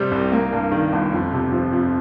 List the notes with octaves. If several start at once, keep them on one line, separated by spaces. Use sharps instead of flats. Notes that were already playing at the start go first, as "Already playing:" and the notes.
Already playing: C3 G3 C4
C2
A#3
G2
D#3
G1
F2
C3
F3
F2